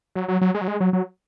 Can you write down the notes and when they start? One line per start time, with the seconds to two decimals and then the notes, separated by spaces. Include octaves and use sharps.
0.15 F#3
0.28 F#3
0.41 F#3
0.55 G#3
0.61 F#3
0.68 G#3
0.80 F#3
0.93 F#3